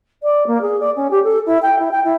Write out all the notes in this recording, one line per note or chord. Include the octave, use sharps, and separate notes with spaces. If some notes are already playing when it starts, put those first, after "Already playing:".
D5
A#3
G#4
D5
C#4
G4
A4
E4
G5
E4
G5
E4